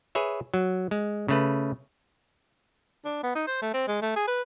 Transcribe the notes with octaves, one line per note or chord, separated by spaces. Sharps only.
G#4 B4 C#5 E5
F#3
G#3
C#3 A3 B4
D4
B3
D#4
C5
A3
C4
G#3
A3
G#4
B4